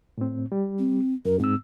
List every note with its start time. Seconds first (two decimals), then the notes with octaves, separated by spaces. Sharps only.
0.18 A2 C4
0.52 G3
0.79 C4
1.25 F#2 A#4
1.40 G#2 C4 E6